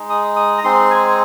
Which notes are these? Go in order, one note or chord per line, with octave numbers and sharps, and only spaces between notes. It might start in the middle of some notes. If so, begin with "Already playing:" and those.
Already playing: G#3 D#4
D#6
D#6
A#5
G#3 C4 D#4 C6
G#5